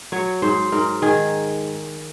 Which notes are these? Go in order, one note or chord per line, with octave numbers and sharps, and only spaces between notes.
F#3 C#5
G#2 C5
G#2 A#4
D#3 G#4